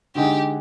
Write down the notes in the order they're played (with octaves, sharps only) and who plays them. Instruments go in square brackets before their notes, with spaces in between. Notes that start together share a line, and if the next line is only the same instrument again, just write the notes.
[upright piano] D3 G#3 D#4 [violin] G4